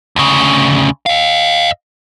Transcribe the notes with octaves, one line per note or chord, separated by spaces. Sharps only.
D2 C#3
D#5 F5